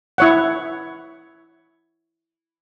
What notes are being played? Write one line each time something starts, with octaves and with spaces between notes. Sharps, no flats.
E4 C#5 F#5